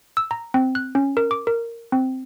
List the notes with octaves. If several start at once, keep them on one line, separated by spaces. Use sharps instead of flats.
E6
A#5
C4
F#6
C#4
A#4
D6
A#4
C4